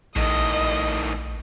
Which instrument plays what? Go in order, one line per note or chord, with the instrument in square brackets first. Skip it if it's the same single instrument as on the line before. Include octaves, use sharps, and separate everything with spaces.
[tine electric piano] A#1 [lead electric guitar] A2 D#3 [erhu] D#5